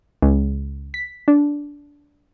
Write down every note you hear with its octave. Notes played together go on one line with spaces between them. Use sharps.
C#2
B6
D4